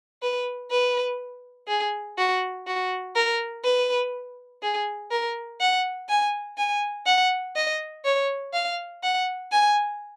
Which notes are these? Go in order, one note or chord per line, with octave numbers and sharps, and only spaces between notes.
B4
B4
G#4
F#4
F#4
A#4
B4
G#4
A#4
F#5
G#5
G#5
F#5
D#5
C#5
F5
F#5
G#5